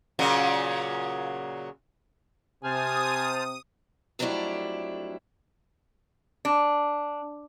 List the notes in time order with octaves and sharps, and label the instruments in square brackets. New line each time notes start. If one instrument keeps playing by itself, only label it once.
[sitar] A#2 C#3 F#3
[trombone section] C3 [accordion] C5 A5 F6 [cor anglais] G#5 [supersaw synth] D#6
[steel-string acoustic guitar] F2 F#3 G3 A3 D4 E4
[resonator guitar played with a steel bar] D4